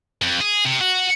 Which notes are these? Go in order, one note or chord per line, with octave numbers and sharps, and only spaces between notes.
F2
G#4
C3
F#4